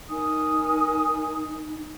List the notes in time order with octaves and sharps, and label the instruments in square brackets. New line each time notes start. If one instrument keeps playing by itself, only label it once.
[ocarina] D#4 [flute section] A#4 G#5 D#6